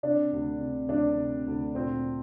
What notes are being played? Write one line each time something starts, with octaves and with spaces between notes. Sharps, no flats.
C3 D4 D5
D2
C3
D2 D4 D5
C3
D2
A#2 C4 C5